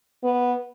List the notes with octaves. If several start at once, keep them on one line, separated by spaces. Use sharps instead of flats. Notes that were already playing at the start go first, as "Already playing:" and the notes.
B3